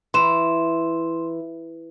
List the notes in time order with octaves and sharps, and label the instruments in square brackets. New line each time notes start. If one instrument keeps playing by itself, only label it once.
[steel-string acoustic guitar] E3 [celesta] C6 E7